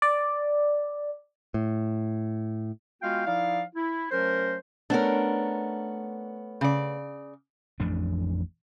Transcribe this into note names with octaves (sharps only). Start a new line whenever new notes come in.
D5
A2
G#3 B3 F4 F#4 F5 G5
F3 D#4 E4 D5 F5
E4
F#3 A3 C#4 A#4 C5
A3 B3 C#4 D4 A#4
C#3 D5
A1 F2 A3 D4